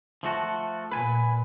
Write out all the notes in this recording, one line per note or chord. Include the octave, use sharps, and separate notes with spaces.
F3 A3 F#4
A#2 B4 G#5